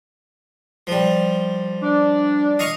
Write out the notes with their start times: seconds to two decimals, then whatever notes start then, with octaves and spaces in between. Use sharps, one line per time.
0.87 F3 G3
1.83 D4
2.59 D#5 F5 C#6